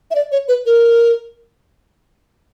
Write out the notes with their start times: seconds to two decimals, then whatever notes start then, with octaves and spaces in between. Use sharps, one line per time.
0.11 E5
0.15 D5
0.32 C#5
0.48 B4
0.66 A#4